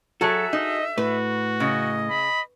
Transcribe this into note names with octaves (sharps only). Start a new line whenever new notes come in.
F#3 F#4 G#4 A4 E5
D#4 D#5
A2 F#4 B4
C#3 D#5
B5